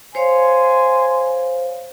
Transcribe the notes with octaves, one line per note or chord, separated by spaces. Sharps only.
C5 C#5 F5 G#5 C6